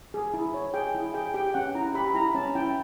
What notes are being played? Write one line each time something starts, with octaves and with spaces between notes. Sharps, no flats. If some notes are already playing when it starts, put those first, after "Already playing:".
G#4
E4
C#5
G#4 G5
E4
G#4 G5
G4 G5
C#4 F#5
E4 A#5
G4 B5
B5
E4 A#5
C#4 A5
E4 G5